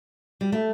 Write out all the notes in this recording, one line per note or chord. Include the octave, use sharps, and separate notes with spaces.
G3
A3